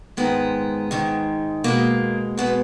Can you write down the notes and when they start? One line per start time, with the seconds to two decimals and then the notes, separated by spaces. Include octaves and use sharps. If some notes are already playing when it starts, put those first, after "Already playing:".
0.17 G#2 D#3 G#3 B3
0.91 G#2 D#3 G#3
1.64 B2 G#3 A#3
2.38 B2 G#3 B3